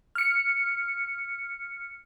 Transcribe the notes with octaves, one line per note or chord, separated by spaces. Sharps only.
F6 C#7